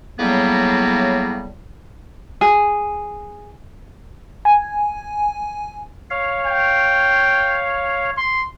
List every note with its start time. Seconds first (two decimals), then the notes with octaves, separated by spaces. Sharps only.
0.19 A2 C#3 F#3 G3 A#3 B3
2.41 G#4
4.45 G#5
6.10 C#5 F5
6.46 G5
8.18 C6